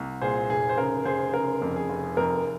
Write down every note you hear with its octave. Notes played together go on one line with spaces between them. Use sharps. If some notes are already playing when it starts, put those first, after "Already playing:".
Already playing: C2
A#2 G#4 C5
F1 G#4
C5
C#3 A#4
F1 G#4 C5
C#3 A#4
F2
G#4
F1
F2 A#4